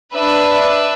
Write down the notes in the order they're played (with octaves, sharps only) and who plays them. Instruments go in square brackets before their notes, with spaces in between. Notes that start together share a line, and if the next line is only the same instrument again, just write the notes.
[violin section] D4 B4 E5